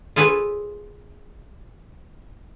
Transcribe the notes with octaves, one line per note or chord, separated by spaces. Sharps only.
F4 G#4 A4 B4 C#5